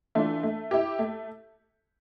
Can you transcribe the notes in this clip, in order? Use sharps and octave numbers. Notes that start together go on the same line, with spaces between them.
E3 A3 D4 F4
A3
E4 G4
A3